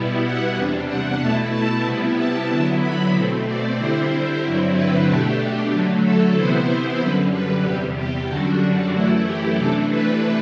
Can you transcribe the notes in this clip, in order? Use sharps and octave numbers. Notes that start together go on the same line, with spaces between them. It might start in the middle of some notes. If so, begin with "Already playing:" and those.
Already playing: B2 G3 B3 E4
F#5
E2 C3 G3 D4
F#5
B2 A3 E4 A5
A5
C3 G3 B3 E4
A5
D3 F#3 B3 E4 A5
B5
B2 A3 C4
D5
D3 G3 C4 E4 C5
G2 D3 F#3 C4 E4
B4
B2 A3 D4 G4
D3 F#3 A3
A4
C3 E3 B3 E4 C5
F#2 D3 G3 B4
B4
E2 C3 G3 G4
G4
F#2 D3 G3 D4 F#4
F#2 E3 A3 E4
G4
C3 E3 A3 D4 A4
B4